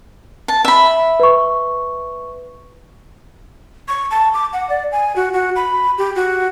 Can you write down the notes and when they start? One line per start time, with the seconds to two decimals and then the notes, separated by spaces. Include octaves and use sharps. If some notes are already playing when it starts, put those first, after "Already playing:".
0.48 A5
0.65 E5 B5
1.20 B4 C#6
3.88 C#6
4.11 A5
4.34 D6
4.53 F#5
4.70 D5
4.92 G#5
5.16 F#4
5.33 F#4
5.56 B5
5.98 G4
6.16 F#4